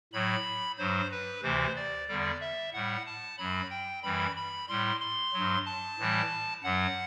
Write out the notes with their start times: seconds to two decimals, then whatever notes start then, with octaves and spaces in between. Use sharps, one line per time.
0.13 A2 F#3 B5
0.78 G2 F#3 C5
1.11 B4
1.43 D2 C3 E3 C5
1.76 D5
2.08 E2 D3 G3 D5
2.41 E5
2.73 A2 G3 F#5
3.06 A5
3.38 F#2 F#3 B5
3.70 G5
4.03 F#2 E3 G3 B5
4.36 B5
4.69 A2 G3 C6
5.01 C6
5.33 F#3
5.38 G2
5.66 A5
5.99 A2 E3 G3
6.63 F#2 F#3 F#5